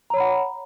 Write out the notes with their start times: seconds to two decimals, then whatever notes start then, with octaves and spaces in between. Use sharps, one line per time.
0.10 A#5
0.14 C#5
0.17 B5
0.20 F#5